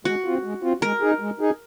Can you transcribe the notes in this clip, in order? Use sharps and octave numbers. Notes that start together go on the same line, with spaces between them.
G#3 F#4
C4 F4
G#3
C4 F4
G#3 A#4
D#4 G#4
G#3
D#4 G#4